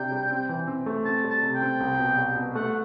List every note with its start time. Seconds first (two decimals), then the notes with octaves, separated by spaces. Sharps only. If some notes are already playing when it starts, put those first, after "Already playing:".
Already playing: C3 D4 G5
0.11 G3
0.30 C4
0.49 E3
0.67 C4
0.86 A3
1.05 C4 A5
1.24 G3
1.30 A5
1.43 C3
1.55 G5
1.61 C4
1.80 C2
1.99 B2
2.18 G3
2.36 B2
2.55 A3 F#5